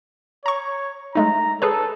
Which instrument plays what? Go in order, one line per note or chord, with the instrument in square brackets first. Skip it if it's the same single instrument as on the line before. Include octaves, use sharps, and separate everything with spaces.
[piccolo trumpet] C#5 [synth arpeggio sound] A#5 C#6
[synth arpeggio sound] G#3 A3 D#4 [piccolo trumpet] A#5
[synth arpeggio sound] G#4 B4 C#5 [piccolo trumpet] A4